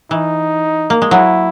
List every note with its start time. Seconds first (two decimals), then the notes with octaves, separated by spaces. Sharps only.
0.11 E3 D#4
0.90 A#3
1.02 G#3
1.11 F#3 E4